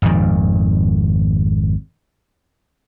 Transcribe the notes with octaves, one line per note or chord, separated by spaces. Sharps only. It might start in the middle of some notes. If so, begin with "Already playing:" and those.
G#1 F2 A#2 D#3